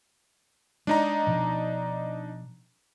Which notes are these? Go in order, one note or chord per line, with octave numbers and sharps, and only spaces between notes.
G#3 D4 D#4 A#5
B2 F3